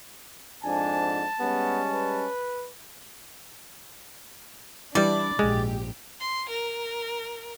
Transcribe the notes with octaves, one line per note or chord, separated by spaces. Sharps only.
F2 G#2 D4 G#5 A5
G3 G#3 B3 C#4
B4
E3 G3 D4 E4 D5
A#1 G#2 G#3 G4
C6
A#4